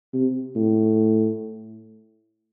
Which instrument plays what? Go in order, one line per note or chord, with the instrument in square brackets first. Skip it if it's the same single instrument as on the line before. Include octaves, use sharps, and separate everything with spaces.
[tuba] C3
A2